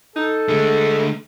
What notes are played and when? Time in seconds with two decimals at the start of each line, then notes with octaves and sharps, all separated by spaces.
0.16 D#4 A4
0.48 D3 G#3 A3